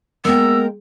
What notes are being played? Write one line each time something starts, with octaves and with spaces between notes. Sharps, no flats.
G#3 A#3 B3 A#4 G5 E6